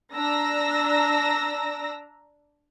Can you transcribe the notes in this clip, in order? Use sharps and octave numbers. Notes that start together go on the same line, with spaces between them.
D4 A#5 E6 A#6